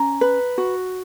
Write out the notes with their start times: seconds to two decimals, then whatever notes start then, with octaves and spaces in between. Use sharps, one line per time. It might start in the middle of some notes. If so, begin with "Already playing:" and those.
Already playing: C#4 A#5
0.21 B4
0.58 F#4